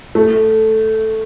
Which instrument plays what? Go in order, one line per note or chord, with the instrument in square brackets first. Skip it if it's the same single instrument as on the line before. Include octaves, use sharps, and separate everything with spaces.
[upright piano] A3